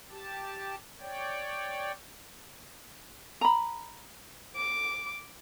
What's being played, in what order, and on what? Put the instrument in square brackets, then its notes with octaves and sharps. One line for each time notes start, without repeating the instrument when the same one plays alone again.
[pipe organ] G4 A5
C#5 D5 G5
[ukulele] A#5 B5
[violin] D6